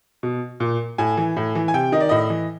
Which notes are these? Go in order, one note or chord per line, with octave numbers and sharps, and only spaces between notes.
B2
A#2
A2 G#5
E3
A2
E3
G#5
C3 G5
D#3 D#5
D5
A2 D#5
E3